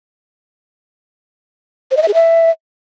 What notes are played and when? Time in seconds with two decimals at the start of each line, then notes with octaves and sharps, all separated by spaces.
1.91 C5
1.97 D#5
2.02 E5
2.08 G#4
2.14 E5